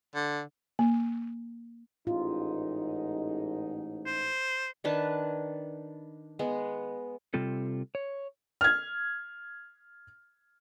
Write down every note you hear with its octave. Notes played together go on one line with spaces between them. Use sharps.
D3
A#3
A1 G#2 D#4 F4
C5
D#3 D4 B4 A5
G#3 B3
C3 G3 C4 F4 A4
C#5
F6 G#6